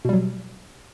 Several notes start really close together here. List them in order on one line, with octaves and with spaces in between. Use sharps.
B2 G3 F#3